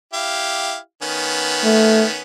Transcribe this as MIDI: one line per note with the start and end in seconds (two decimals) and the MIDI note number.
0.13 0.77 64
0.13 0.77 67
0.13 0.77 77
1.02 2.21 51
1.02 2.21 59
1.02 2.21 61
1.64 2.05 57